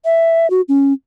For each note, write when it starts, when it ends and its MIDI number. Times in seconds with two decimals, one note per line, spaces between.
0.05 0.49 76
0.50 0.61 66
0.69 0.93 61